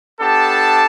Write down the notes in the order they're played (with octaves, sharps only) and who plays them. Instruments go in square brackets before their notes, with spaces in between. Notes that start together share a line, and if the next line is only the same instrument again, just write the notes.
[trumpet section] B3 D4 G4 A4 A5